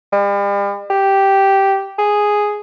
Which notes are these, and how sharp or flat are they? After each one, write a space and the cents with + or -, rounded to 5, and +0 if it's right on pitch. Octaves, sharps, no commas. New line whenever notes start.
G3 +40
G4 -5
G#4 +0